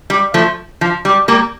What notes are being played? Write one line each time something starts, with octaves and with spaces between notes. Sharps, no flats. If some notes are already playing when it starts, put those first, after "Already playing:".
G3
F3 A3
F3
G3
G3 A#3